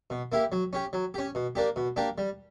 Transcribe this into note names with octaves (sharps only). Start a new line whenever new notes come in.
B2
A#3 E4 G4
F#3
C#4 G4
F#3
C#4 G4
B2
A#3 D4 G4
B2
A#3 D4 G4
G3